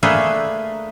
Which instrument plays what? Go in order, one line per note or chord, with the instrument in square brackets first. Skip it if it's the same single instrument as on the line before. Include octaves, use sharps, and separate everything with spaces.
[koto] A3 A#3 D4 G#4 A4 B4